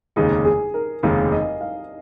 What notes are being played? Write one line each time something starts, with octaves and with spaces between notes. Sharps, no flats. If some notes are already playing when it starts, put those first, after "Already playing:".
F1 D#2 C#3 G#3 D#4 G#4
G#4
A#4
F1 D#2 C#3 G#3 D#4 F5
D#5
F5